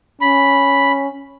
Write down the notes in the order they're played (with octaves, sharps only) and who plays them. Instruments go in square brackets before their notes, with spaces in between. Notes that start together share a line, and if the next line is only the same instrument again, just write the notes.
[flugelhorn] C#4 [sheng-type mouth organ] B5